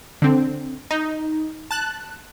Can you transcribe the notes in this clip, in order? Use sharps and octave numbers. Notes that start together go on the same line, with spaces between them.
D3 C4
D#4
A5 F#6